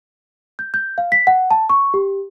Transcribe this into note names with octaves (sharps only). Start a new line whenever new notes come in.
G6
G6
F5
B6
F#5
A5
C#6
G4